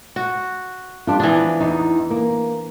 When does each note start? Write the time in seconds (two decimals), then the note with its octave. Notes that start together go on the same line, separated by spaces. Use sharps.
0.16 F#4
1.07 G3 D4 F4
1.20 E3 F3 B3 D4
1.60 E2 D#4
2.10 A#3